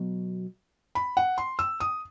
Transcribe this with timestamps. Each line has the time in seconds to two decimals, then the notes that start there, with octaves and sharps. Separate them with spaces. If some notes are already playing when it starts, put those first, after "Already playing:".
Already playing: B2 F#3
0.95 B5
1.17 F#5
1.38 C6
1.59 E6
1.80 D#6